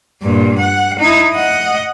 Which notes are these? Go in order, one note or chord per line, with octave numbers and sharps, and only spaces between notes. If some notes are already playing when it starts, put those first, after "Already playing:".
G2 A#2
F#5
D#4 E4
D#5 F#5